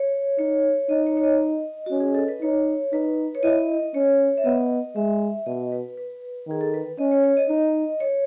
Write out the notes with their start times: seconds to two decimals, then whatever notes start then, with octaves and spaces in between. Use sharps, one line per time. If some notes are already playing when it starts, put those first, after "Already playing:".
Already playing: C#5
0.38 D#4 C#5
0.89 D#4 D#5
1.07 C#5
1.17 C#5
1.24 D#5
1.86 C#4 F#4
2.00 G#4
2.15 A4
2.28 B4
2.42 D#4 C#5
2.93 D#4 B4
3.35 C#5
3.43 E4 D#5
3.94 C#4 C#5
4.38 E5
4.45 B3 D#5
4.96 G#3 E5
5.46 B2 D#5
5.72 B4
5.97 B4
6.47 D#3 G#4
6.61 A4
6.74 B4
6.98 C#4 D#5
7.12 C#5
7.24 C#5
7.37 D#5
7.49 D#4 D#5
8.00 C#5